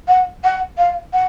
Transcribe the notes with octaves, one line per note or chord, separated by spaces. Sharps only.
F#5
F#5
F5
F#5